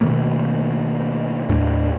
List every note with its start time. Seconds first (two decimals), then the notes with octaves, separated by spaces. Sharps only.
0.01 B2 D#3 A3 A#3
1.49 D#2 A2 A3 D4